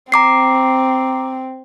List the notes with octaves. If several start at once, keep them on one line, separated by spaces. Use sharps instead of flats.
C4 A#5 D6 C7